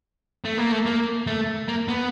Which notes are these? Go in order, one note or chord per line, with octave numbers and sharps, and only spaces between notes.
A3
A#3
A3
A#3
A3
A#3
B3